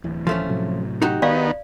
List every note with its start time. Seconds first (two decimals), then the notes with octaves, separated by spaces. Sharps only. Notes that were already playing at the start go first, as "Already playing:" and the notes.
0.04 D1 E3
0.27 F3 A3 C#4
0.49 A2 C3 F#3
1.02 D#4 F#4 G4
1.22 D#3 B3 D5 F5